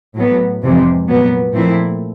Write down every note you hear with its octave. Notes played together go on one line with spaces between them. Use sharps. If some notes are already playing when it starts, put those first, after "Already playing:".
A2 F#3 B3
F2 C3 E3 G#3
A#2 F#3 B3
A#2 F3 A3 C4 E4